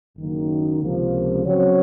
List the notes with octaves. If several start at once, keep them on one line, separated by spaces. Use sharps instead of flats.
F#1 F#2 D#3 A#3
C#2 C3 F3 A#3
C#3 F#3 C4 F#4 C#5